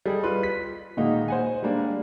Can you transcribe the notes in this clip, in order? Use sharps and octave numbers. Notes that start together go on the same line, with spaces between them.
G3 G#4 A4 D#5
F4 B4 C6
B6
A#2 D#3 G#3 A#3 D#4 F#4
C5 F#5 G#5
G3 G#3 A#3 D4